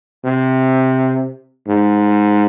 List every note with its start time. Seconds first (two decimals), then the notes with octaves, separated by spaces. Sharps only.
0.24 C3
1.67 G#2